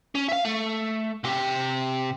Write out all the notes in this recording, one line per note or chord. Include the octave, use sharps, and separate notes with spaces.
C#4
E5 F5
A3
C3 G4